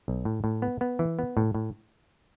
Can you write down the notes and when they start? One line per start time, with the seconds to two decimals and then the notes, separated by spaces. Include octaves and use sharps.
0.08 B1
0.25 A2
0.44 A2
0.62 B3
0.81 B3
0.99 E3
1.19 B3
1.37 A2
1.55 A2